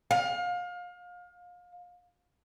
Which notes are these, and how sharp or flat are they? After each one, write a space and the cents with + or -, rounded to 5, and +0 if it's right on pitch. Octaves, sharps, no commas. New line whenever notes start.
F5 +30